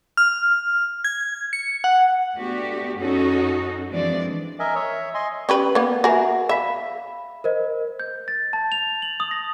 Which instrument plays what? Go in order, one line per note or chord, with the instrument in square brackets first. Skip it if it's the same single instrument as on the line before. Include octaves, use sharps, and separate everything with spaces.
[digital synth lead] F6
G#6
C#7
F#5
[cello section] A3 B3 D4 F#4 G4
F#2 C#4 D#4 F#4 A4
E3 F3 G#3 C4 D4 D5
[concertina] A#4 D#5 E5 G#5
C#5 E5
D#5 G#5 C6
[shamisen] C#4 G4 B4
A#3 B3
[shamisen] F#4 A#4 [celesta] E5 F#5 G#5
[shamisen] E5 [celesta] F5 B5 B6
[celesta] A#4 C5 D#5
[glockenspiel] G6
A6
A5
F7
F#7
D#6
A#6